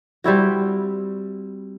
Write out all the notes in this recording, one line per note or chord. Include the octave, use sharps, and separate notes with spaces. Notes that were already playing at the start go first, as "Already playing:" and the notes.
G3 C4 E4 F#4